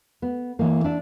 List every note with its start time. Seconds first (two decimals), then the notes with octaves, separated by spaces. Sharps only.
0.22 B3
0.59 E3 A#3
0.84 D4 E5